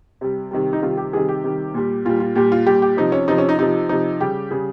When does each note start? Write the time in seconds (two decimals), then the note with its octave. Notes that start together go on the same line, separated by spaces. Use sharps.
0.21 C3 G3
0.51 C3 D#3 G3
0.73 D#4
0.82 C3 D#3 G3 F4
0.97 G4
1.13 C3 D#3 G3 G#4
1.29 G4
1.44 C3 D#3 G3
1.74 A#2 G3
2.05 A#2 G3 F4
2.20 F4
2.35 A#2 G3 G4
2.52 F4
2.67 A#2 G3 G4
2.82 G4
2.97 C3 F3 D#4
3.12 C#4
3.28 C3 F3 D#4
3.38 C#4
3.49 D#4
3.59 C3 F3 D#4
3.89 C3 F3 D#4
4.20 C#3 G3 G4
4.51 C#3 G3 G#4